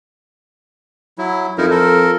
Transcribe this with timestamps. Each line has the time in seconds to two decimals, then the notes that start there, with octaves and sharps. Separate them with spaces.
1.18 F#3 E4
1.58 F2 D#4 E4 A#4
1.71 A4 A#4